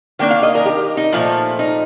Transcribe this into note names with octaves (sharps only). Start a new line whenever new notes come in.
D#3 A#3 D4 G5
F5
D#5
A#4
G4
D#4
A#2 F3 A3
D#4